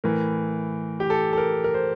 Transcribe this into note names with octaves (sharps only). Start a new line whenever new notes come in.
A2 E3 A#4
G4
A4
A4
A#4
A#4
C5